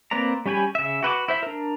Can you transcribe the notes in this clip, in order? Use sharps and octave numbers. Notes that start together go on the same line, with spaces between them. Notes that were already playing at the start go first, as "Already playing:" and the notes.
A#3 C4 B4 D5 A#5
G3 C#4 G4 G#5 B5
C#3 E5
F#4 B4 G5 D6
E4 C5 E5
D4 A#4